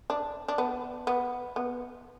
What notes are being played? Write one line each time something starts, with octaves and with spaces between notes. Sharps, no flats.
D4
D4
B3
B3
B3